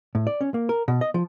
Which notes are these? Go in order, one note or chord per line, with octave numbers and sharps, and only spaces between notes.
A2
D5
C#4
A#3
A#4
B2
D#5
F3